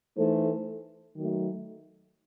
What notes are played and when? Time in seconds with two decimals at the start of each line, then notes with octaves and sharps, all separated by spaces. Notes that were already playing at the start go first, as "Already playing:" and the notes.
0.17 E3 A3 D#4 A4 C5
1.15 D#3 F#3 A3